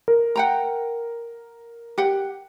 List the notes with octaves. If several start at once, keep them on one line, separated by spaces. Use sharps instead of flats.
A#4
F#5 G5 A#5
G4 F#5